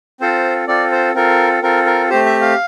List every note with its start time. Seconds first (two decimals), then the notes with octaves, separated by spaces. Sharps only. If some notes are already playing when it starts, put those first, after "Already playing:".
0.21 C4 F4 A4 C5
0.68 C4 F4 A4 D5
0.92 C5
1.15 C4 F4 A4 A#4
1.62 C4 F4 A4 A#4
1.86 A#4
2.10 A3 C4 G4 C5
2.25 E5
2.41 F5